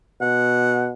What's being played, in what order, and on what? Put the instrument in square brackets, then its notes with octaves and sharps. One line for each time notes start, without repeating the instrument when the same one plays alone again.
[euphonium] B2 [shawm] F#5